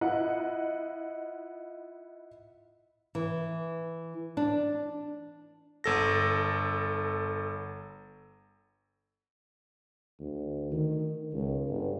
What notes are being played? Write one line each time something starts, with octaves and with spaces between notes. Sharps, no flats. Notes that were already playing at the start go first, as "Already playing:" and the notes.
E4 F4 D#5 F#5
E3
D4
G1 A4 A#6
D2
D#3
C#2
G1